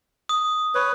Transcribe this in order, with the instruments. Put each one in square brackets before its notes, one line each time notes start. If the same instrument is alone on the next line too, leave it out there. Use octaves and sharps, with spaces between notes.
[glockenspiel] D#6
[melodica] B4 C#5